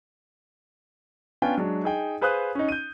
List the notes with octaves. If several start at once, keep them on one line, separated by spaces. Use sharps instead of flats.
B3 C#4 D4 F4 G5 G#5
F#3 G#3 D4
D#4 G#4 G5
G#4 B4 C5 F5 D#6 F#6
C#4 D#4
G6 D#7